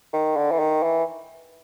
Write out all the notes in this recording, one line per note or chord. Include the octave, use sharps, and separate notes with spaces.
D#3
D3
E3
D#3
E3